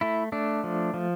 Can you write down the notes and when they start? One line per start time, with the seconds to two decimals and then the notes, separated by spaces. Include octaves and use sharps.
0.01 A3 E4
0.32 A3 D4
0.64 F3
0.94 F3